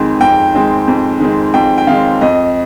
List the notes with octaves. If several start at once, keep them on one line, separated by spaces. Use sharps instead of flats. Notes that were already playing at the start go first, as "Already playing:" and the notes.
Already playing: F2 D#3 G#3 C4
F2 G5
D#3 G#3 C4
F2
D#3 G#3 C4
F2 G5
G5
D#3 G#3 C4 F5
F2 D#5